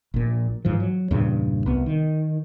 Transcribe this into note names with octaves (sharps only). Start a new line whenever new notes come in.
A#1 A#2
G#2 E3 F3
F#3
E2 G2 A#2 C#3
C2 B3
D#3